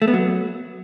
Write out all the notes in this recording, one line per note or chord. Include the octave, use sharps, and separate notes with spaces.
A3
B3
F#3